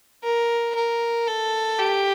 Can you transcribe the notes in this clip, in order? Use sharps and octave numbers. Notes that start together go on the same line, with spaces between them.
A#4
A#4
A4
G4